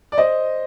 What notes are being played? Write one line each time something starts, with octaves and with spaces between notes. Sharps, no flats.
D5
C5 D#5